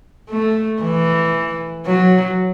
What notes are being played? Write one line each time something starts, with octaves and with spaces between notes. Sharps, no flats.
A3
E3
F#3